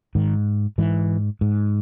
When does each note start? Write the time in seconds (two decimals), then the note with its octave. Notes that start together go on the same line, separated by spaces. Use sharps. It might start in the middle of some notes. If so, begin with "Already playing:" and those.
0.15 G#2 D#3
0.78 G#2 E3
1.41 G#2